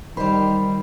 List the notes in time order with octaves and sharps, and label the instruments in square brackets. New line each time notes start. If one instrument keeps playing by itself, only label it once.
[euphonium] D#3 [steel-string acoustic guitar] G3 C5 [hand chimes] B5